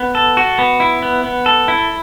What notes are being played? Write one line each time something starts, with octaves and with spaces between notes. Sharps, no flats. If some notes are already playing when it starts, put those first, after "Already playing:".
Already playing: B3
A4
F#4
B3
E4
B3
B3
A4
E4